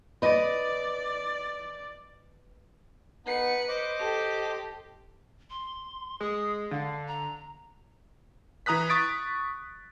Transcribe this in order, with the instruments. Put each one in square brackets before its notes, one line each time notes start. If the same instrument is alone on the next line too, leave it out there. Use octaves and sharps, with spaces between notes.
[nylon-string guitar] B4 D#5 [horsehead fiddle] D5
[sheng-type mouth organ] B3 D#4 [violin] B4 C#7
[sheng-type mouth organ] C5 D#5 D6
[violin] G4 A4
[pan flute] C6
[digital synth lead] G#3 [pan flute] D#6
[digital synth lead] D3 [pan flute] F5
[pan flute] A#5
[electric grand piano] E3 A#5 D#6 F#6 B6
C#6 D#6 A6 B6 D7